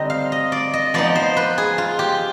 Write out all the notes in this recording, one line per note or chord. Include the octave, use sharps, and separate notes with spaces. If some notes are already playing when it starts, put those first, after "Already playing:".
Already playing: D3 G3 C4 D#4 C5 D#5
F5
D#5
D5
D#5
F3 B3 D#4 D5
C5
B4
G#4
F4
G4